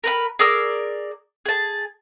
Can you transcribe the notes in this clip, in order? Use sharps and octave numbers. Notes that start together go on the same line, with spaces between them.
A#4 B4 B5
G#4 A#4 D5 E6
G#4 A5